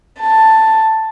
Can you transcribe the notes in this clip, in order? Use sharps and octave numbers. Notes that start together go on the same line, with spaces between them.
A5